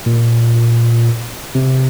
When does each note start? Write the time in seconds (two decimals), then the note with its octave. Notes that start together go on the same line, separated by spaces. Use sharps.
0.06 A#2
1.55 C3